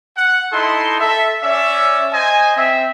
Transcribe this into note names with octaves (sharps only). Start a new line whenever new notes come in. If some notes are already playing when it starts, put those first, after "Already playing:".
F#5
D#4 E4 A4 D#5 C6
A4 E5
C#4 D5 E5
C5 D#5 G#5
C4 E5